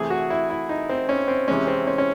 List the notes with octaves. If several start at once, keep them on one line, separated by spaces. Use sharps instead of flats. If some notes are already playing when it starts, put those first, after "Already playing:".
Already playing: C3 E3 A3 G#4
F#4
E4
E4
D#4
C4
C#4
C4
C3 E3 G#3 C#4
C4
C#4
C#4